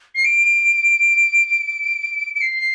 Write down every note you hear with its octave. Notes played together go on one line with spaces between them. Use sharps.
C7
D7
D7
C7